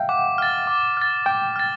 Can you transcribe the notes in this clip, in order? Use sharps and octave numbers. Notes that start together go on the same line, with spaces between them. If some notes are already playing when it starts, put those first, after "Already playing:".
Already playing: E5 F5 G5
F#5 D6
F6 A6
D6
F6 A6
G5 D6
F6 A6